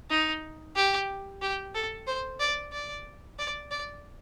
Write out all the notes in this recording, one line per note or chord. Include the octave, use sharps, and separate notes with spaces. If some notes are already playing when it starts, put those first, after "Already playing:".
D#4
G4
G4
A4
C5
D5
D5
D5
D5